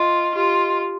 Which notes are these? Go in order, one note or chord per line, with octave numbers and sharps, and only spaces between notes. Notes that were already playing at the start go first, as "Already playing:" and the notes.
Already playing: F4 D#5
F4 G4
C6